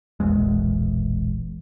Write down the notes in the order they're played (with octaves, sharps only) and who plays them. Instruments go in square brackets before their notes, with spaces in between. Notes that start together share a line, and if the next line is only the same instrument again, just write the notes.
[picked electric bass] E1 A#1 E2 G#3